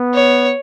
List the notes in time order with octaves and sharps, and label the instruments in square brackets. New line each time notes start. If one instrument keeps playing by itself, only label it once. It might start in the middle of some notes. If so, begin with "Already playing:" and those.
Already playing: [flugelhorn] B3
[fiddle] C#5